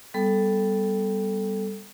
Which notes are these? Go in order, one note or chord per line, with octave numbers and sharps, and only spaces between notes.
G3 B3 A4